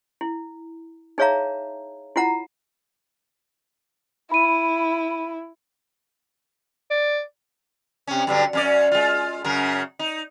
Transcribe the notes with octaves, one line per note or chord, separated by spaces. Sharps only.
E4
D#4 G#4 C#5 E5 F5 A#5
E4 F4 F#5 A#5
E4 B5 D#7
D5
C3 C#4
G2 D3 F#3
F#2 C#4 D5
G#3 F4
F#2 C#3 A#4
D#4